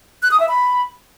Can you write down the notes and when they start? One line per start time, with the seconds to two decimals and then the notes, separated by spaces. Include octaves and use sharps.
0.23 F#6
0.31 D#6
0.40 E5
0.49 B5